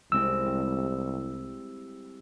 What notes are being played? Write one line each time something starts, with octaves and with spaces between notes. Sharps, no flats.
C2 G#3 C4 E4 E6
G3